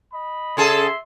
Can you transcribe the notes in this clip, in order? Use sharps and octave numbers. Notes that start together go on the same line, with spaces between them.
D#5 B5
C#3 G#4 A4 E5 C6